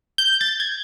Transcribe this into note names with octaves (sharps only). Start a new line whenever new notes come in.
G6
A6
G#6